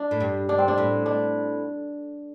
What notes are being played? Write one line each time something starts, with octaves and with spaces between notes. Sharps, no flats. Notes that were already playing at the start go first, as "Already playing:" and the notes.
Already playing: D4
A2
G2
D4
C4
D4
A2
D4